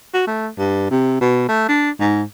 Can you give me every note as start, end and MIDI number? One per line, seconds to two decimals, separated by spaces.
0.14 0.26 66
0.27 0.49 57
0.58 0.88 43
0.91 1.19 48
1.21 1.48 47
1.49 1.68 57
1.68 1.90 62
2.00 2.23 44